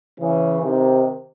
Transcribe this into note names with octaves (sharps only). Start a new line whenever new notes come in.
C#3 E3
C3 D#3